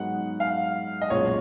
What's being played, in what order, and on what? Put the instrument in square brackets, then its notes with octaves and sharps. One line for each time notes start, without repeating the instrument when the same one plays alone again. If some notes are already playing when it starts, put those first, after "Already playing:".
Already playing: [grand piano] G#2 F#3 B3 D#4 G#4 [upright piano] F#5
[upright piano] F5
D#5
[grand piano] B1 A#2 G#3 C#4 F4 [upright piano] C#5